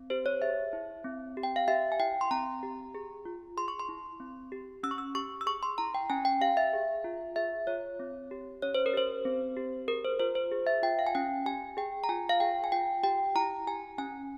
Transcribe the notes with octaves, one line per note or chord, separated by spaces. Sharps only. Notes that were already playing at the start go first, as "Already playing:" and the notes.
Already playing: C4
G4 C5
C#5
G#4 E5
E4
C4
G4
G5
F5
G4 E5
G#5
E4 G5
C6
C4 A#5
G4
G#4
F4
G#4 C6
C#6
C6
E4
C4
G4
C#4 E6
C#6
E6
G4 C#6
E6
G#4 C#6
C6
E4 A#5
G5
C#4 G#5
G5
G4 F5
E5
G#4
F4
G#4 E5
F4 C#5
C4
G4
C#4 C#5
C5
A#4
G4 C5
C4
G4
G#4 A#4
C5
F4 C5
C5
G#4
E5
F4 G5
F5
G#5
C#4 G5
G4 G#5
G#4 G5
A#5
F4 G#5
F5
G#4 G5
G#5
F4 G5
G4 G5
E4 A#5
G4 G#5
C#4 G#5